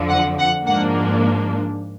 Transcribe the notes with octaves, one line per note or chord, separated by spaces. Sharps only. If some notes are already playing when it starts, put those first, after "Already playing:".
Already playing: F2 D3 F3
F#5
F#5
G#2 F3 A#3 D4 F#5